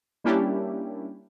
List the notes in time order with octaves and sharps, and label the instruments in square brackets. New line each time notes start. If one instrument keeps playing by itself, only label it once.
[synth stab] G3 A#3 C#4 D4 E4 G4